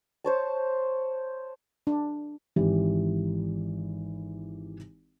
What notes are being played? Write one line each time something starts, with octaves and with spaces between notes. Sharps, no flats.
C5 C#5 A5
D4
G#1 E3 E4 G4